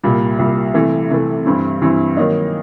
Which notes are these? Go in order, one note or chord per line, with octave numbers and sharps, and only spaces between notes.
C2 A#2 G3
C2 A#2 G3
C3 E3 A3
C3 E3 A3
G2 E3 G3 C4 E4
G2 E3 G3 C4 E4
D#3 F#3 A#3 D#4